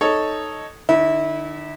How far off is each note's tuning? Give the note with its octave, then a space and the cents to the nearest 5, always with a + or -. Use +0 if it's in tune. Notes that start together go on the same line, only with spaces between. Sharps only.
D#4 -5 A4 +0 C#5 +0
D3 +40 E4 -25